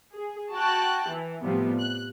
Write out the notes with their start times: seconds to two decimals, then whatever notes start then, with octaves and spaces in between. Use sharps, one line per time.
0.16 G#4
0.53 F#4 G5 A5 F#6
1.09 E3
1.44 A2 C3 F3 G3 B3
1.79 F#6